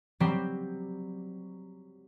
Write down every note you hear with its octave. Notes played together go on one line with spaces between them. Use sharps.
F#3 G3 C4 G4